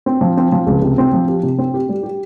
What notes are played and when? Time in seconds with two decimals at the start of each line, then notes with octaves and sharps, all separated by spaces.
0.06 C4
0.21 F3
0.37 C4
0.52 F3
0.67 C#2
0.82 C3
0.98 C4
1.13 F3
1.28 G4
1.43 C3
1.58 C4
1.74 G4
1.89 G3
2.03 G4